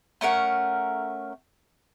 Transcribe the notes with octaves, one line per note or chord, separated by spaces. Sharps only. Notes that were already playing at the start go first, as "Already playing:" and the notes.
A3 C#4 A#4 F#5